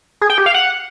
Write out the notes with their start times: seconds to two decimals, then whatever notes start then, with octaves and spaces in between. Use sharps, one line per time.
0.21 G#4
0.30 G5
0.38 G4
0.46 F5
0.54 F#5